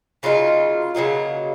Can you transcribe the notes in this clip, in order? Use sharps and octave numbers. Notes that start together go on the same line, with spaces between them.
C#3 F#3 A#3 D#4 F4
C#3 F#3 A#3 D#4